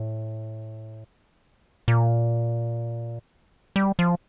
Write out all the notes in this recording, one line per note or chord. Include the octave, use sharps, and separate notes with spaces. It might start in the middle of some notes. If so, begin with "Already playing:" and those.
Already playing: A2
A#2
G3
F3